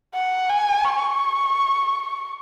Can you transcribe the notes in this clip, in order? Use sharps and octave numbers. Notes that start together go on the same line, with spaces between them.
F#5
G#5
C#6